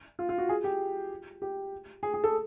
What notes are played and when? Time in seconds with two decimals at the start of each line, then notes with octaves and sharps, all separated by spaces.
0.19 F4
0.29 F4
0.38 F#4
0.49 G#4
0.64 G4
1.42 G4
2.03 G#4
2.14 G#4
2.24 A4